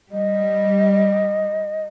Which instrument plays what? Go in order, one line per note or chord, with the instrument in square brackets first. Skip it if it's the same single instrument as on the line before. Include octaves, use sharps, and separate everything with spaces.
[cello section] G3 [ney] D#5